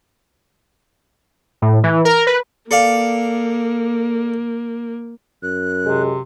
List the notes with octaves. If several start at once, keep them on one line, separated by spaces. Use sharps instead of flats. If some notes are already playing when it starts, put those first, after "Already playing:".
A2
E3
A#4
B4
A#3 A4 D5 F5
F#2 F#6
C3 G#3